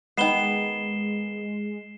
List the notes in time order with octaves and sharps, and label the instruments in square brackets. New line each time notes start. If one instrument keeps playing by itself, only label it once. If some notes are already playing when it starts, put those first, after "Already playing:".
[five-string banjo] D#3 B3 [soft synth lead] G#3 [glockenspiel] C7 E7 G7